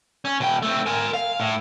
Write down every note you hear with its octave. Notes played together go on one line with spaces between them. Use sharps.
C#4
B2 G5
A3 C4
A#4 G#5
F5
A2